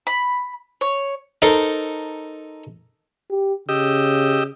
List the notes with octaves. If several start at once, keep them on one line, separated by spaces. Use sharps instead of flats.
B5
C#5
D#4 A4 A#4 C5
G4
C#3 G4 D#5 E6